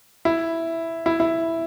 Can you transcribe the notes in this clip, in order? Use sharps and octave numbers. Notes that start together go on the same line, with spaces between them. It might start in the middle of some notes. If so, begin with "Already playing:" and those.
E4
E4
E4